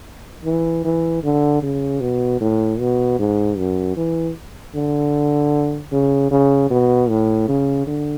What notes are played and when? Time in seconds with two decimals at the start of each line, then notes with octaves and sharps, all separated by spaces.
0.45 E3
0.84 E3
1.23 D3
1.62 C#3
2.01 B2
2.41 A2
2.79 B2
3.19 G#2
3.57 F#2
3.96 E3
4.75 D3
5.92 C#3
6.31 C#3
6.70 B2
7.09 A2
7.48 C#3
7.87 D3